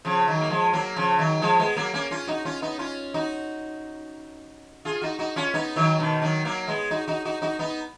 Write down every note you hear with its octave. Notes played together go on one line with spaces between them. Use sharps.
C#3 F3
D#3 F#3
A#3
F3 G#3
F#3 A#3
C#3 F3
D#3 F#3
F3 G#3
G#3 B3
F#3 A#3
A#3 C#4
C#4 F4
D#4 F#4
C#4 F4
B3 D#4
C#4 F4
D#4 F#4
F4 G#4
D#4 F#4
D#4 F#4
C#4 F4
B3 D#4
D#3 F#3
B2 D#3
D#3 F#3
F#3 A#3
G#3 B3
D#4 F#4
D#4 F#4
D#4 F#4
D#4 F#4
B3 D#4